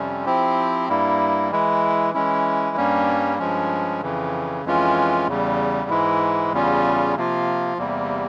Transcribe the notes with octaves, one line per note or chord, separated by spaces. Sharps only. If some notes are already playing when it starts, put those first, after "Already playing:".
Already playing: F2 C3 G3 C#4
F3 C4 E4 G4
G2 G3 A#3 E4
E3 G#3 E4
E3 G#3 C#4 E4
G2 G3 A#3 C#4
G2 F3 G#3 C#4
F2 C#3 E3
F2 E3 G#3 C#4 F4
E2 C#3 G3
G#2 E3 G#3 E4
E2 C#3 G3 C#4 F4
C3 F3 A#3 F4
E2 C3 G3 A#3